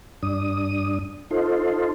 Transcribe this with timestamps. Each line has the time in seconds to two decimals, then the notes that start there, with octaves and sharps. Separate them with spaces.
0.23 G2 D4 D#6
1.31 D#4 F4 A4 C5